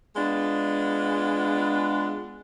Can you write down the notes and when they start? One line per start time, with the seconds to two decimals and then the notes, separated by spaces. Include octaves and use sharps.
0.16 G#3 B3 D4 F4